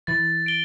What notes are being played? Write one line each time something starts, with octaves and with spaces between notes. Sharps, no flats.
E3 A6
D7 G7